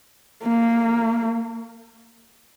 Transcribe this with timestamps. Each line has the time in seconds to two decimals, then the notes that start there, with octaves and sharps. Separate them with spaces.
0.44 A#3